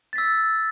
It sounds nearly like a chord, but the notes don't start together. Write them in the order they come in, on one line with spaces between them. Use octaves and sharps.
A6 B6 E6